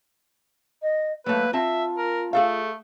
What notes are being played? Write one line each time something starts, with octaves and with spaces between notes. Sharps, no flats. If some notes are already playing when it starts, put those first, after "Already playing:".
D#5
F#3 A3 A#3 B4
C4 F4 E5 A5
A#4
A3 G#4 A4 F5